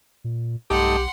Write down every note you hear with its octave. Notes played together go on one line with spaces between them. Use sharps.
A#2
B1 G2 A3 D#4 G4 F#5 C6